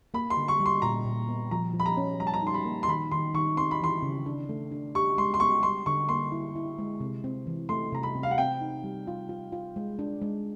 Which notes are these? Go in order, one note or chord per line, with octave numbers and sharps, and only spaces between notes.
A#3 B5
C6
D3
C#6
G3
C6
A#2 A#5
A#2
B3
F3 A#5
F3
B5
A#5
C#4
G3 A#5
A5
A#5
D#4 C6
B5
A#3
C6
D#3 B5
D#3 C6
D#3 C#6
C4 C6
B5
E3 C6
C#3
D4
A3
D4
G4 C#6
G#3 C6
C6
B3 C#6
G3 C6
D3 C#6
A#3 C6
E4
E4
G#3
C3
C4
E3
A3 C6
C3 A#5
B5
C3
F5
F#5
C4 G5
D#4
G3
F4
F4
F4
G#3
D4
G#3